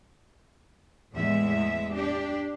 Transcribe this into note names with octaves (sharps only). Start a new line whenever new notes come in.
E2 A2 G#3 E5
D4 G4